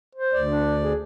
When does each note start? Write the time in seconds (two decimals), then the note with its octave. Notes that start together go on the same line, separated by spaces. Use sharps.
0.15 C5
0.33 D2 D5
0.47 D4
0.83 G#4